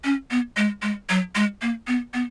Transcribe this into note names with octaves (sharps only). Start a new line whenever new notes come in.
C#4
B3
G#3
G#3
F#3
G#3
A#3
B3
B3